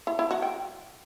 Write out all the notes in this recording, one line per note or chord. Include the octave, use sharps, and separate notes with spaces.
E4
E4
F#4
G5